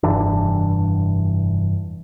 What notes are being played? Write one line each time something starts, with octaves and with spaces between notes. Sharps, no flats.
F1 G2 E3 D4